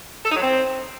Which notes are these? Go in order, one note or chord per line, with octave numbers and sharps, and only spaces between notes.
A4
D#4
F#3
C4